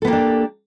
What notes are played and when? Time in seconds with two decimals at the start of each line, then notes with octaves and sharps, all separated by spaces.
0.02 A4
0.05 B3
0.07 A#3
0.10 G4
0.13 D4